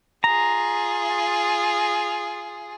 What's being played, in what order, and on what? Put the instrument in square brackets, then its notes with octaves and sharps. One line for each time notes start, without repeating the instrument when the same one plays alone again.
[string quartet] F4 G#4 [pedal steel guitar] A#5